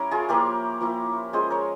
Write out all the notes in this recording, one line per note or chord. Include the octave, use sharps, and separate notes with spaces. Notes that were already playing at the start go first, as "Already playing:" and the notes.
Already playing: G3 C#4 E4 A#4 C#5
F4 G#4
F3 A#3 E4 G4 A#4
F3 A#3 E4
G#3 C#4 F4 G#4 C5
A#4 C#5